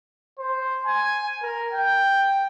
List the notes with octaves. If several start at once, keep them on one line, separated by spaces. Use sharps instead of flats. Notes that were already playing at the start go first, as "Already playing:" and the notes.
C5
G#5
A#4
G5